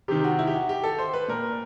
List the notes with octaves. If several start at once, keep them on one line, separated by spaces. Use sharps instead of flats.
C3 D#3 G4
F#4
E4
G4
F#4
G4
A4
C5
B4
A#2 A#4